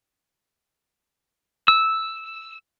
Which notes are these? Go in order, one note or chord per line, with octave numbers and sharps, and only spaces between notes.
E6